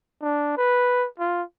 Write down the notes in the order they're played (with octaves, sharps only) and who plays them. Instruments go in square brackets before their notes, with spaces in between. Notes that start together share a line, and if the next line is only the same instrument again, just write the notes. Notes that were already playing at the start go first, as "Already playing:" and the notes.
[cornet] D4
B4
F4